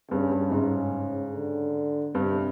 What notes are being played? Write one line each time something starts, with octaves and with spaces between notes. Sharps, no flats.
G2 C#3
G2
G#2 C#3
D3
G2 C3